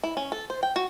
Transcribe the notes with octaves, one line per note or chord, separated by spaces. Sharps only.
E4
C#4
A4
C5
G5
F#4